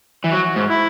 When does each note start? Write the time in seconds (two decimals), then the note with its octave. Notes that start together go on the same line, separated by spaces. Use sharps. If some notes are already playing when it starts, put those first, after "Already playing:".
0.24 E3
0.32 F#3 F#4
0.56 G#2
0.69 E4